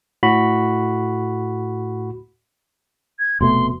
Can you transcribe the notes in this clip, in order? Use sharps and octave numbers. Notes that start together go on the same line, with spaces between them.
A2 F#4 B5
G#6
F1 B2 A3 C6